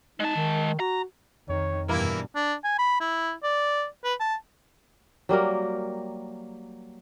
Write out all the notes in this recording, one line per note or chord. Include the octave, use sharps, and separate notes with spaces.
G#3 D#4 A5
D#3
F#4 A#5
F2 D#3 C#5
G2 B2 E3 A#3 E4 A#4
D4
G#5
B5
E4
D5
B4
A5
F#3 G3 A#3 A#4